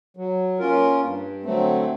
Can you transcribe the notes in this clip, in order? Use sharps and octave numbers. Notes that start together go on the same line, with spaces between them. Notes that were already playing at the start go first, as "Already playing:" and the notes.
F#3
A#3 C#4 F4 A#4
G2
D3 F#3 A3 C4